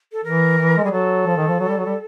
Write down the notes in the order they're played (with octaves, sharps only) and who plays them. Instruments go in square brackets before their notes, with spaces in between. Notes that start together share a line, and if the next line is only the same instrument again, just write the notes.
[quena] A4
[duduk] E3 [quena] A#4
[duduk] E3
G#3
[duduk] G3 [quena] G#4
[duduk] F#3 [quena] A4
[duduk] F3
D#3
F3
F#3
G3
F#3
G3